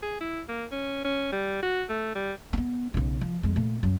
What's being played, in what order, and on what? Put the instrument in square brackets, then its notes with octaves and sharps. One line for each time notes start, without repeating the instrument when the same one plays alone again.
[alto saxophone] G#4
E4
A#3
C#4
C#4
G3
F#4
A3
G3
[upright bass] B3 C4
B1 C#3
F3
F2 G#3
A#2 A3
F#2 F#3